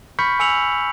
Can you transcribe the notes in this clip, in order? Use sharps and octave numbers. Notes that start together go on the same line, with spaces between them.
B5 C#6 F6 G6 B6 C#7
G#5 E6 C#7 F7 F#7